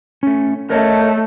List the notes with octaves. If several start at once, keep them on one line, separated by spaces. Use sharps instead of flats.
A3 C#4
A3 A#4 C#5 D#5